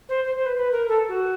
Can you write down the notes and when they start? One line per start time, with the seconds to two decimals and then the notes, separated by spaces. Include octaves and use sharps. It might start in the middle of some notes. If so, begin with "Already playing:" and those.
0.08 C5
0.24 C5
0.35 C5
0.45 B4
0.56 B4
0.71 A#4
0.88 A4
1.08 F#4